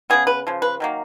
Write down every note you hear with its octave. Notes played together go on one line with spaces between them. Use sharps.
C#3 F3 B3 G#4
B4
C#3 F3
B4
D#3 F#3 A#3